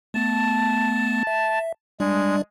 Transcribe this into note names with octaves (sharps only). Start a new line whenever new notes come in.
A3 B3 A5
E5
G3 G#3 D4 D5